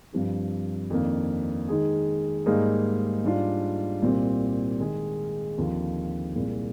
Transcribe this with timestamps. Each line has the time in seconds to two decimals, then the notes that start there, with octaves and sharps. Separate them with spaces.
0.13 G2 F3 C4 G4
0.90 F2 D#3 A#3 D4
1.68 D#3 G#3 D#4 G#4
2.46 G#2 G3 A#3 D#4 G#4
3.24 G#2 G3 D4 F4
4.02 C2 A#2 G3 C4 G4
4.79 D#3 G#3 D#4 G#4
5.58 D#2 D3 F3 C4 F4
6.35 C2 A#2 G#3